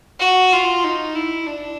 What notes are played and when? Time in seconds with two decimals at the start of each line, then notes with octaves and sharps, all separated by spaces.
0.20 F#4
0.52 F4
0.84 D#4
1.15 E4
1.47 D4